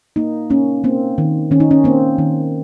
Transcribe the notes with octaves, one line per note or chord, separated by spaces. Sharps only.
A#3 D#4
A#3 C#4
A#3 C4
D#3
D#3 C#4
D#4
C#4
A#3 C4
D#3